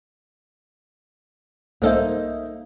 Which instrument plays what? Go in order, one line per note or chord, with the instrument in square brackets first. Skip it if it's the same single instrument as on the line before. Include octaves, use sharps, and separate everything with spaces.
[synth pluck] C2 A4 C5 [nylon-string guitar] A#3 D#4 [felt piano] A#4 D#5 E5